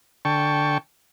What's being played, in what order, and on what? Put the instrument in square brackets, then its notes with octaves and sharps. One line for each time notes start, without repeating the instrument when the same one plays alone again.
[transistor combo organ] D3 G5 A5 C#6